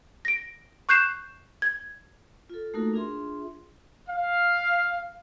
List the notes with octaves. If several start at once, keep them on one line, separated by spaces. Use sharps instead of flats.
A#6 D7
C#6 F#6 G6 C7 E7
G#6
F4 A4
A3 A#3 D#4 F#4 A4 A#4
D4 F4 G#4 E5 C6
F5